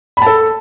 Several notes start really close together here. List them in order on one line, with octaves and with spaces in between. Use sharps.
B5 A5 A4